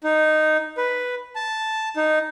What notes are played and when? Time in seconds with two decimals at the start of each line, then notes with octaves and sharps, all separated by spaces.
0.04 D#4
0.77 B4
1.36 A5
1.96 D#4